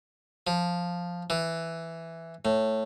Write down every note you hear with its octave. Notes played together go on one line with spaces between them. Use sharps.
F3
E3
A2